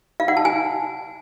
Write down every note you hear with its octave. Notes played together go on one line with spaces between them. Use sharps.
F5
F#5
A5
G#5